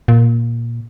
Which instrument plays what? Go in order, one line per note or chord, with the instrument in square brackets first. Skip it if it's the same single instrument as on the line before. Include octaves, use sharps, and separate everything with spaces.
[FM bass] A#2